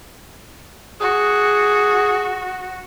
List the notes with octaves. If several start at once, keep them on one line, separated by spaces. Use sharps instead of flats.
F#4 G#4